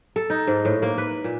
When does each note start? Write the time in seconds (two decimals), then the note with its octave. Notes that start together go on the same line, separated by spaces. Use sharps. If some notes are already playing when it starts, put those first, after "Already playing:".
0.16 A4
0.30 D#4
0.47 G#2
0.65 A2
0.82 A#3
0.98 B4
1.24 A#2